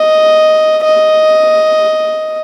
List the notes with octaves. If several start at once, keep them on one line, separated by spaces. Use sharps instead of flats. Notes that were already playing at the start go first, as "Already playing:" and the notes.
Already playing: D#5
D#5